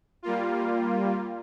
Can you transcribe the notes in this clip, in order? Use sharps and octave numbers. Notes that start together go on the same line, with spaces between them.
G3 A#3 F4